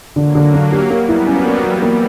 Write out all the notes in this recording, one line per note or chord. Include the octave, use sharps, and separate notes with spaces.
D3 F#3 A#3
D3
D4
G4
G3 A#3 B3
E4
F#3 A#3 C#4
A#3
E3 F#3 G3
A#3